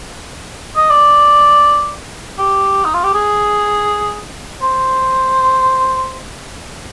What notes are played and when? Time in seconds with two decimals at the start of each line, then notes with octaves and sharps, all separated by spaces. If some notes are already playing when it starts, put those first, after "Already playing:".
0.76 D#5
0.90 D5
2.38 G4
2.84 D#4
2.94 F4
3.03 G4
3.14 G#4
4.62 C5